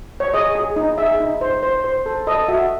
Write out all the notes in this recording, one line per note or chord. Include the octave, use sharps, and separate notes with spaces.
C#5
G#4 D#5
G#4
D#4
G#4 E5
D#4
C5
C5
C5
A4
A4 D#5
F#4 E5